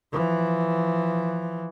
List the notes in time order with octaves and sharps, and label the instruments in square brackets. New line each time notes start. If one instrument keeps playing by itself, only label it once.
[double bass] E3 F3